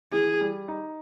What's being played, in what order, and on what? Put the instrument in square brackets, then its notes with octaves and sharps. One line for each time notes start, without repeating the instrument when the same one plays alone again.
[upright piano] E3 [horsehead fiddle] G#4
[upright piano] G3
D#4